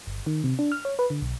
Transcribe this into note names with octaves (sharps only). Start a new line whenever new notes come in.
G1
D#3
C3
D4
F6
C#5
B4
D3
B1